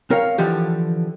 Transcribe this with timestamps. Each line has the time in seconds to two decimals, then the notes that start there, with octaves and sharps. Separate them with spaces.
0.10 C4 A#4 C#5 F5
0.38 D3 E3 F3 G4